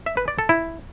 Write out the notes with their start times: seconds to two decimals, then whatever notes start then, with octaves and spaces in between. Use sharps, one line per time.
0.06 E5
0.17 B4
0.28 D5
0.39 A4
0.49 E4